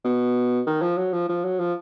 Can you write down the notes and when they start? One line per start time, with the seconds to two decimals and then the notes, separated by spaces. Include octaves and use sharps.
0.04 B2
0.67 D#3
0.82 F3
0.97 F#3
1.13 F3
1.29 F3
1.44 F#3
1.60 F3